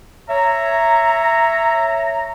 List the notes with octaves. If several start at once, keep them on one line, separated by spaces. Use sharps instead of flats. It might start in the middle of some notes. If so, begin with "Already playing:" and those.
C#5 E5 A#5